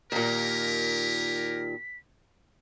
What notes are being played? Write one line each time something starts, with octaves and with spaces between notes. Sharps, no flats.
D#2 A#2 C#4 G4 A#4 B6